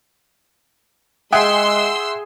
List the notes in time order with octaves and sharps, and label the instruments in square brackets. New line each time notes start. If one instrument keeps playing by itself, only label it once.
[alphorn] G#3 [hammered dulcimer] G#4 [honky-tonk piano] E5 F#5 G5 [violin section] C6 E6